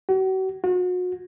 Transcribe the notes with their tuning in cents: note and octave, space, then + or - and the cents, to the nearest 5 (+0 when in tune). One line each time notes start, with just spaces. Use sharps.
F#4 +40
F#4 -35